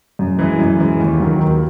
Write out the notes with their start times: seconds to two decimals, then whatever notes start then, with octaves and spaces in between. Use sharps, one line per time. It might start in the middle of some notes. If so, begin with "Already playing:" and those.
0.19 F#2
0.39 E3 G#3
0.59 F#2
0.80 E3 G#3
1.00 D#2
1.20 D#3 F#3
1.40 D#2